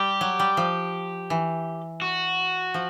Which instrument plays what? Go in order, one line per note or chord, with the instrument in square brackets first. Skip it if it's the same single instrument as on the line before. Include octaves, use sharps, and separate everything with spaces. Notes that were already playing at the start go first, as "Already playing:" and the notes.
Already playing: [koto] G3 [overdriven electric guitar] G4
[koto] F#3
G3
F3
E3
[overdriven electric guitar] F#4
[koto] F3